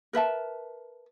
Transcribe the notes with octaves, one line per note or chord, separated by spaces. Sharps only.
A#4 B4 E5 A5